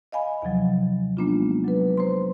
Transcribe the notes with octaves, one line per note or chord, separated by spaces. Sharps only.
D#5 F5 G#5 B5
D#2 C3 F3 F#3
G#3 A#3 B3 D4 D#4 F4
F#3 B4
C5 A#5 C6